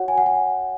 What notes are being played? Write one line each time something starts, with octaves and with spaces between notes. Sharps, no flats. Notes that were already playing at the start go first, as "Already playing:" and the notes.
Already playing: F#4 C#5 F#5
G#5
F#5
G#5